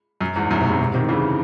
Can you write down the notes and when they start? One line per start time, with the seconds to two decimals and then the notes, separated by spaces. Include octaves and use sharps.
0.21 F#2
0.36 E2 G#2
0.51 F#2 A2
0.60 G#2 C3
0.69 F#2 A2
0.80 G#2 C3
0.94 C3 D#3
1.09 C#3 E3